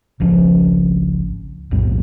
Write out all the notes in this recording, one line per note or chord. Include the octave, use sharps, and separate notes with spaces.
G#1 C#2 F3 C#4
B1 F2 A2 G3